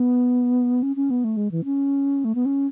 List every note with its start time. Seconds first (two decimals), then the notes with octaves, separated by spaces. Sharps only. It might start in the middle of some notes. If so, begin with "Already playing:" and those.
Already playing: B3
0.83 C#4
0.96 C#4
1.10 B3
1.24 A3
1.37 G#3
1.51 E3
1.65 C#4
2.25 A3
2.35 B3
2.45 C#4